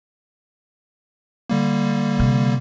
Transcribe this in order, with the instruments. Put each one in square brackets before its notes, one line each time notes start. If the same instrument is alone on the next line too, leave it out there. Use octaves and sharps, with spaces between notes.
[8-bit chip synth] D3 G3 A#3
[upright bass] C3